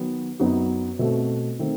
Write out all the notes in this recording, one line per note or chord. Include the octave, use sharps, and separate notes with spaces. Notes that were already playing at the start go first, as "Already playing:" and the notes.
Already playing: D#3 F#3 B3
F#2 F#3 B3 D#4 F#4
B2 A3 C4 F#4
D#3 A3 C4